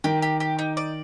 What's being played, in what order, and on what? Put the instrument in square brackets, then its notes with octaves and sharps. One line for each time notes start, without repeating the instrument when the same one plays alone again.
[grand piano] D#3 [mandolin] G4
[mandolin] G4
G4
D#4
D5